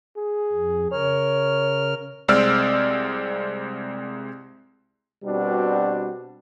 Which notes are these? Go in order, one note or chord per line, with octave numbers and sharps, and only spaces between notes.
G#4
F2
C#3 A#4 C#5 F6
C2 G#3 C4 D5 E6 F6
B2 G3 C4 D4 F#4